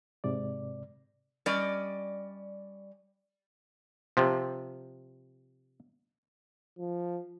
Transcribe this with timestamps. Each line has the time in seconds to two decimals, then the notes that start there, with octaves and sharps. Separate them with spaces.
0.24 G#2 C3 D5
1.46 G3 C#4 D5 D#5
4.17 C3 F3
6.78 F3